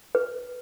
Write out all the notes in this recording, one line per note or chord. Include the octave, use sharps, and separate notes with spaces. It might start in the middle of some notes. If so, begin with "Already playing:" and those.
B4